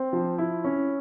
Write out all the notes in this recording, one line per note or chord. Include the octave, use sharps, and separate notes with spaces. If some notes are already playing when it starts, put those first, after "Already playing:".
Already playing: C4
F3
E4
C#4